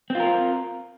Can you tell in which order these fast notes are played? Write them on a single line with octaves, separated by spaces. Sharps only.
C4 F4 A#4